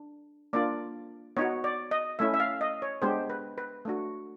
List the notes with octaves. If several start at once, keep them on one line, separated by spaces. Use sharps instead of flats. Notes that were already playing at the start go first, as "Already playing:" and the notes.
Already playing: D4
A#3 D4 F4 D5
B3 D#4 F#4 C#5
D5
D#5
A3 C#4 E4 E5
E5
F5
D#5
C#5
G#3 B3 D4 G4 C5
B4
B4
A3 D4 F#4